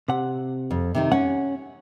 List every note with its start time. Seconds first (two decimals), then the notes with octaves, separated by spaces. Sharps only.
0.08 C3 F#5
0.71 F2
0.95 C3 D#3 D#4
1.12 C#4 F#5